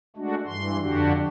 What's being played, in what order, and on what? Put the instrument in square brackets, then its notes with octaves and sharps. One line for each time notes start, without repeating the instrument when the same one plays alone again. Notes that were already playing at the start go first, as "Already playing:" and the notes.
[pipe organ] G#3 A3 D4 F#4
G2 E3 C6
F2 D3 D4 F#4 G4